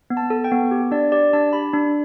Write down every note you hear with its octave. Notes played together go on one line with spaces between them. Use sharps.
B3
A5
A4
G5
B3
G4
D4 D5
G4 D5
D4 A5
G4 B5
D4